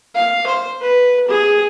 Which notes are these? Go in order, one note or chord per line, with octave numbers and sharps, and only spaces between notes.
F5
C5
B4
G#4